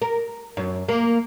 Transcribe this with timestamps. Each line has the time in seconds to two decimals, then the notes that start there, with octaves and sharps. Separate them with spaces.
0.02 A#4
0.57 F#2
0.89 A#3